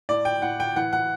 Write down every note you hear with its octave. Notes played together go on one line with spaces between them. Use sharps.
A2 D5
G5
A2 F#5
G5
E3 F#5
F#5